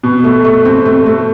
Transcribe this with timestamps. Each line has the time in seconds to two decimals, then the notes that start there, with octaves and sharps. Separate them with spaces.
0.03 B2
0.24 A3
0.44 A3
0.65 C4
0.85 A3
1.06 A3